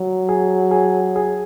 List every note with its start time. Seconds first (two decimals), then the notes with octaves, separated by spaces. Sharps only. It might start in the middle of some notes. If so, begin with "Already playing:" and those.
Already playing: F#3
0.29 G#4
0.71 G#4
1.16 G#4